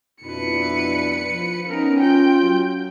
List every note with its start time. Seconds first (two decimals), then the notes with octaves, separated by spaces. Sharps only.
0.23 F2 B2 D4 E4 B4 C#7
1.29 F3
1.69 B3 C#4 D#4 A#4
2.00 F4 G5 G6
2.42 F#3